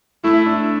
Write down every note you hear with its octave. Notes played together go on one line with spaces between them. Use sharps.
A3 E4
D4